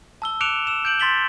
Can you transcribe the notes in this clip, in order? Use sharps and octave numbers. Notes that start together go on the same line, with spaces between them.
A5 E6 G7
D6 F#6 C#7 D7 E7 F7
E6 E7
G6 D7 F#7
C6 A6 B6 F#7 G7